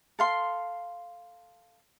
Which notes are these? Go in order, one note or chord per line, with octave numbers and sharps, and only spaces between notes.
A4 F5 C6